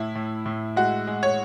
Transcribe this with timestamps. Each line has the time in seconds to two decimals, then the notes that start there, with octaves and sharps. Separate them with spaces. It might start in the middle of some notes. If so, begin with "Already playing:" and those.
Already playing: A2 E4
0.15 A2
0.46 A2
0.76 G#3 F#4
1.07 G#3
1.23 C#5